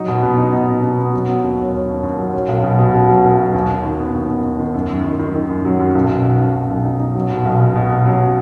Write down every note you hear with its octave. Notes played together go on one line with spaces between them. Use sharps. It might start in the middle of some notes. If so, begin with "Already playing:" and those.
Already playing: F#3 D#4
B2
B3
D#4
D#4
B2
D#4
B3
F#3
F#3
D#2
C#4
C#4
D#2
D#2
F#3
C#4
B1
B2
B2
B2
F#3
B1
F#3
D#2
F#4
D#3
B3
D#2
B3
D#2
D#3
F#2
F#2
D#3
D#3
D#3
F#2
F#3
F#2
B1
B2
B2
B1
B2
B1
D#4
D#4
F#3
B2
B1
B2
B2
B2
F#3